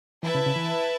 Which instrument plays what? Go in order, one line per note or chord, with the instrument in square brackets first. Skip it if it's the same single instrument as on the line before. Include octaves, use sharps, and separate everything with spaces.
[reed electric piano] E3 [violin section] E4 B4 E5 A5
[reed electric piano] C#3
C#3
E3